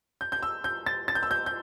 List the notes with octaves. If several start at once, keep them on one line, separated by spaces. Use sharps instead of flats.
G6
G6
E6
G6
A6
A6
G6
E6
G6
G6